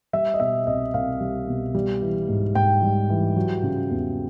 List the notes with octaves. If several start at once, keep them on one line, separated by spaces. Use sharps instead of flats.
G3 E5
D#5
B2 E5
C2 D#5
C2 F5
G3
B2
G3
E3
G#2
G#2 G5
G3
E3
F#3
C#3
E2